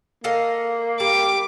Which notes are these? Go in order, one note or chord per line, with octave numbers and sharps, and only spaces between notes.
A#3 A4 D#5 F5
G3 D6